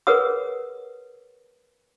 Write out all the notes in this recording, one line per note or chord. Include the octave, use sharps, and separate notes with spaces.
G#4 A#4 B4 C#5 F#5 D#6